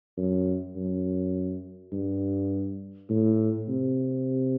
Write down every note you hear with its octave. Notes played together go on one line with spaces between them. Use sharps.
F#2
F#2
G2
A2
C3